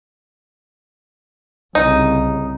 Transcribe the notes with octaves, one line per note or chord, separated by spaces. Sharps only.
C2 C#3 D#4